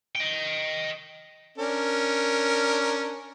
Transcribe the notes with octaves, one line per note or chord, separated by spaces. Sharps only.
D#5 G5
C#4 D4 A#4